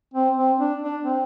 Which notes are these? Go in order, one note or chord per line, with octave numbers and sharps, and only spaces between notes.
C4
C4
D4
D4
C4